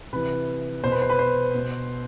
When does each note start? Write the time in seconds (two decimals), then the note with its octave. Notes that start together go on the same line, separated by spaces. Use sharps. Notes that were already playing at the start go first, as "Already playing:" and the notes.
0.13 C3 E3 B4
0.84 B2 C5
0.92 B4
1.02 C5
1.10 B4
1.19 C5
1.54 B2